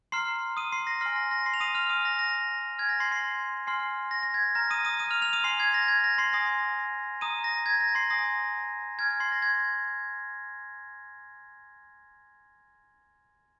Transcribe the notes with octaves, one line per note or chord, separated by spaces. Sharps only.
A#5 C6 F6 C7
D#6 D#7
C6 C7
A#6
G#5 C6 F6 C7
A#6
A#6
C6 C7
F7
D#6 D#7
F6 F7
G#5 D#6 F6 D#7
A#6
A#6
G#5 F6 G#6
A#6
C6 C7
C6 C7
G#5 C6 F6 C7
A#6
A#6
G#6
A#5 F6 A#6
D#6 D#7
D#6 D#7
D#6 D#7
F6 F7
F6 F7
D#6 D#7
G#5 C6 F6 C7
G#6
A#6
G#6
A#6
C6 C7
G#5 D#6 A#6
A#5 D#6 D#7
A#6
G#6
A#6
C6 C7
G#5 D#6 A#6
G#5 F6 G#6
G#6
C6 C7
A#6
G#6